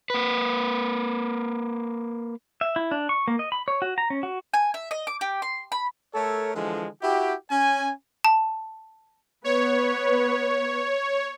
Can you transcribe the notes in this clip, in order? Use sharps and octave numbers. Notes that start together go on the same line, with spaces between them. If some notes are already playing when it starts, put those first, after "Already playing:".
A#3 B4
E5
E4
D4
C#6
A#3
D#5
B5
C#5
F#4
A#5
C#4
F#4
G#5
E5
D#5
D6
G4
C6
B5
A3 A4 A#4 C#5
D3 E3 F3 G#3
E4 F#4 G4
C#4 G#5
A5
B3 B4 C#5